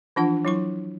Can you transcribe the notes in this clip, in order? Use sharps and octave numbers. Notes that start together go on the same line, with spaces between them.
E3 F3 D4 F4 F#5
F#3 E4 C#6